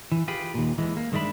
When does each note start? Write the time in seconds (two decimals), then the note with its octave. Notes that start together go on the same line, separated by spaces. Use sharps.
0.12 E3
0.28 F4 G4 G#4 B4
0.54 D#2 A#2
0.78 E3 G#3
0.97 A#3
1.12 G2 D#3 G#3 D4 E5 B5